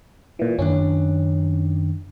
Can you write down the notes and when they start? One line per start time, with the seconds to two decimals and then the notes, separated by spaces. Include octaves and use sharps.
0.39 A#2 E3
0.59 F#2 D#3 C#4 D4